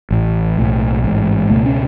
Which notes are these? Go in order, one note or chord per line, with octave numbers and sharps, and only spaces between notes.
A1 A2
B1 A2
A1 G#2
C#2 B2 A3
C#4